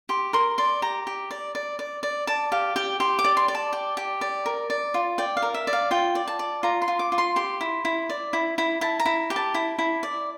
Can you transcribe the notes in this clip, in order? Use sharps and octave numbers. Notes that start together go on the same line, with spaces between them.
G4 C6
A#4 C6
D5 C6
G4 A#5
G4
D5
D5
D5
D5
D5 A5
G4 F5
G4 G5
G4 C6
D6
D5
C6
D5
A5
G4
G4
D5
A#4
D5
F4
D5 G5
F5
A#4
E5
D5
F5
F4 G5
D5
A5
D5
F4 A#5
C6
F4
D6
F4
C6
G4 C6
E4
E4
D5
E4
E4
E4 A5
A#5
E4
G4
A5
E4
E4
D5